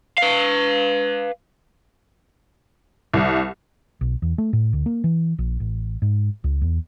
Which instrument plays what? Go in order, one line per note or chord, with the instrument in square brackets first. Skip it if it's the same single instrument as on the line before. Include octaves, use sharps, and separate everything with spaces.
[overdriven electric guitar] B4 F5
[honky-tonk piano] C2
[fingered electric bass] B1
E2
A3
A2
D2
A#3
E3
A#1
A1
G#2
C#2
E2